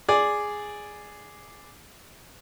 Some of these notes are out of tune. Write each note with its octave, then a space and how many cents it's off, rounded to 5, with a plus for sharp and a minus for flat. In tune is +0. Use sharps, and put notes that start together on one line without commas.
G#4 +0 D5 +0